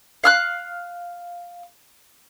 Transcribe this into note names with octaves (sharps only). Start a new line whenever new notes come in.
F5 F6 F#6